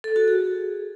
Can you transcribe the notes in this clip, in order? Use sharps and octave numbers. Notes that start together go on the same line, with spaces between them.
A4
F#4
G#4